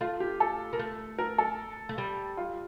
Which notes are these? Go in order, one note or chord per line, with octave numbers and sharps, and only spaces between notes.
A3 F4
G4
A4
A#3
A3
A#4
A4
A3
G3
F4